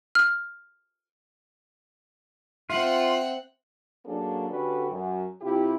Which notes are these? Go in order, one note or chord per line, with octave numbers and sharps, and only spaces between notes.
F6
C4 F4 E5 F#5
F#3 A#3 C#4 D4 G#4 A4
D3 G3 C#4 F#4 A4 B4
F#2
C3 E4 F4 G4